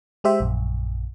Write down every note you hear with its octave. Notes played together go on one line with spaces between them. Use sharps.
G#3 G4 C5 E5
A#1 F#2